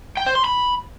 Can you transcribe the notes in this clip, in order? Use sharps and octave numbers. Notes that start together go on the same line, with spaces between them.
G5
C5
C6
B5